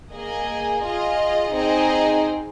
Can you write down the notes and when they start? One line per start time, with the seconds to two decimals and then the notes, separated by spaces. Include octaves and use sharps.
0.13 A#3 G#4 D#5 G#5
0.83 F4 G#4 D#5
1.53 C4 D#4 G#4 C5 D#5